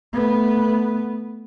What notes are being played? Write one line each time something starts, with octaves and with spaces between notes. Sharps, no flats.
A3 B3